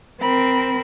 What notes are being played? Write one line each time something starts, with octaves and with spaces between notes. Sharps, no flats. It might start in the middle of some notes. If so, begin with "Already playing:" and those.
C4 A#4 B5